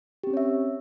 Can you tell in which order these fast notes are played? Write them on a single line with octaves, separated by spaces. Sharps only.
G4 C4 C#4 C#5 E5